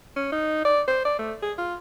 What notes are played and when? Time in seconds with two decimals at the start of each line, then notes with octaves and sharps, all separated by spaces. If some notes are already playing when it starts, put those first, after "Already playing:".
0.16 C#4
0.32 D#4
0.65 D5
0.88 C5
1.05 D5
1.19 A3
1.42 G#4
1.58 F4